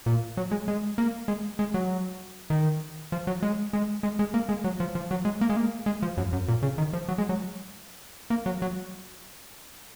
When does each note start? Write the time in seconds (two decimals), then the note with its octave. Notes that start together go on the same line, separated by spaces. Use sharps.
0.06 A#2
0.37 F#3
0.51 G#3
0.68 G#3
0.98 A#3
1.28 G#3
1.59 G#3
1.74 F#3
2.50 D#3
3.12 F3
3.27 F#3
3.43 G#3
3.73 G#3
4.03 G#3
4.19 G#3
4.34 A#3
4.49 G#3
4.64 F#3
4.80 F3
4.95 F3
5.11 F#3
5.25 G#3
5.41 A#3
5.50 G#3
5.56 A#3
5.86 G#3
6.02 F3
6.17 F#2
6.33 F#2
6.48 A#2
6.63 C#3
6.78 D#3
6.93 F3
7.09 F#3
7.18 G#3
7.29 F#3
8.30 A#3
8.46 F#3
8.62 F#3